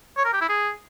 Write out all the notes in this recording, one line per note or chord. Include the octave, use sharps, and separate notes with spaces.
C#5
A#4
G4
E4
G#4